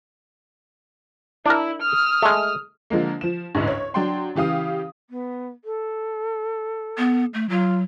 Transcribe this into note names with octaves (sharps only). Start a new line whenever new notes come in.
D4 E4 A#4
D#6 F6
G#3 A3
D3 F3 G#3 A#3
F3 E7
A1 D2 G#2
C#5
F#3 D4 G5 C6
C#3 E3 G4 F5 D#6
B3
A4
B3
A3
F#3 F4